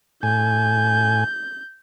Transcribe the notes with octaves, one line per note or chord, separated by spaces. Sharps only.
A2 G#5 G6